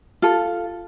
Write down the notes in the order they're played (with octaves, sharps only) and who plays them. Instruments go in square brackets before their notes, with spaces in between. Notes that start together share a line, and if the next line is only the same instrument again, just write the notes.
[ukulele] F4 A4